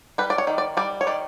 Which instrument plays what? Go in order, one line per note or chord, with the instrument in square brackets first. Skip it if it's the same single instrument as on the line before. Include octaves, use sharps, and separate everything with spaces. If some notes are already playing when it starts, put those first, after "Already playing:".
[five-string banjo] G3 B4
D5
C#5
D#3
D5
G3 D5
C#5
D#3 D5